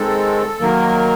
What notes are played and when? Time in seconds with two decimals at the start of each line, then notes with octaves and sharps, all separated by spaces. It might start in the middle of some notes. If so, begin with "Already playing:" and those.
Already playing: D#3 G#3 C4 A4
0.61 D#3 F#3 A#3 A#4